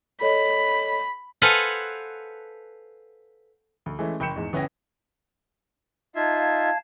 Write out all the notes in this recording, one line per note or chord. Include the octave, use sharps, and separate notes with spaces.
A4 C#5 D#5 B5
A4 B4 C5 F5 F#5 G#5
D2
E3 G#3 A3 C#4 E4
F#1 G5 B5 G6 C#7 E7
E2 G#2
G1 B3 C#4 E4 G5 A#6
D#4 F4 E5 F5 A5 G#6